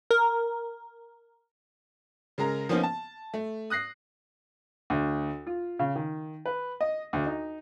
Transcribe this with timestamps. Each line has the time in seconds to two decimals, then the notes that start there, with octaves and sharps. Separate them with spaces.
0.11 A#4
2.38 C#3 G#3 A#4 A#5
2.69 F3 A#3 B3 C#4 D#4 F4
2.83 A5
3.34 A3
3.70 D#6 F#6 A#6 C7
4.90 D2
5.47 F4
5.79 C#3
5.96 D#3
6.46 B4
6.81 D#5
7.13 D2
7.27 D#4